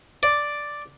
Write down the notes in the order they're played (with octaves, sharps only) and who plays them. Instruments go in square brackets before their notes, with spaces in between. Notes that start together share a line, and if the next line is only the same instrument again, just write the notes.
[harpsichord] D5